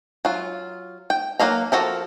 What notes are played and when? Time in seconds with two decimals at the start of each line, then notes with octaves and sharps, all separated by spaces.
0.25 F#3 F4
1.10 G5
1.39 F#3 A3 A#3 F5 A#5
1.72 F3 F#4 A4 A#4